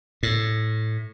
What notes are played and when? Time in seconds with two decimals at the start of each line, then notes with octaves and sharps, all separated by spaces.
0.23 A2